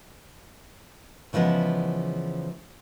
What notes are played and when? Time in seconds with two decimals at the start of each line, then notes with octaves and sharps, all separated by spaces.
1.33 C#3 E3 F3 G#3 B3